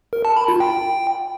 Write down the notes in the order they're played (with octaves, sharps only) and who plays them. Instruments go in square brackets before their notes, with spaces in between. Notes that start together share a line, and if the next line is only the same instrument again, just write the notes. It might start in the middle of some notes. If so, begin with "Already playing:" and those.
[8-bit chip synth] A#4
A5
B5
F4
G5